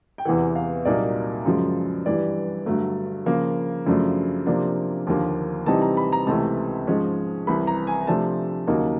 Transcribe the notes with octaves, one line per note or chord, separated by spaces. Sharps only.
G5
E2 C3 E3 F#5
F5
C2 A#2 F#3 A#3 D#4 D5
F#2 C#3 F3 G#3
G2 E3 G3 D5
G2 D3 F#3 A3
C#3 F3 A#3
F#2 C#3 F3 A3 D4
C3 F3 A#3 D4
D#2 D3 F3 A#3
C3 E3 G3 C4 D#4 A5
A#5
B5
A#5
C#2 C3 E3 A3 C#4 A5
G#2 F3 G#3 C#4
C2 C3 E3 B5
A#5
G#5
C3 F3 A3 D4 A5
D#2 C#3 F#3 A#3 D#4